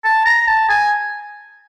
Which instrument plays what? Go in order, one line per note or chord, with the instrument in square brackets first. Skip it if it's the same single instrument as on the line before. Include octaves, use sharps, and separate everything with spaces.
[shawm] A5
A#5
A5
G#5